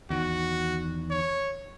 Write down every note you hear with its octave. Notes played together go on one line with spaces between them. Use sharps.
E2 D#3 F#4
C#5